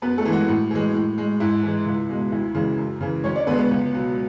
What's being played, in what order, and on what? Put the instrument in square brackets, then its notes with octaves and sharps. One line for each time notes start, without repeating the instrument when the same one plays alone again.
[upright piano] F#2 B3 B4
A3 A4
E3 G#3
F#3 F#4
A2
E3 G#3
A2
G#3
G#2 E4
E3 G#3
C#2
B2 G#3
D2 E4
C#3 E3 G#3
F#2
C#3 E3
D2 C#4 C#5
D4 D5
D3 B3 B4
G#3
B3 B4
C#2
B2 F#3